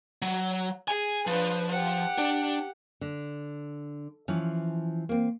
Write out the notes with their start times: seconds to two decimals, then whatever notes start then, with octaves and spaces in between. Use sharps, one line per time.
0.22 F#3
0.88 G#4 G#5
1.27 F3 D4 B4
1.71 G4 F#5
2.18 D4
3.01 D3
4.28 E3 F3 C#4
5.09 A#3 C4